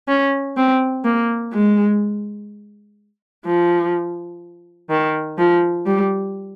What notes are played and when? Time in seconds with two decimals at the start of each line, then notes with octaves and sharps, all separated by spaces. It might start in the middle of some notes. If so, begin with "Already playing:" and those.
0.08 C#4
0.57 C4
1.05 A#3
1.53 G#3
3.46 F3
4.90 D#3
5.38 F3
5.86 G3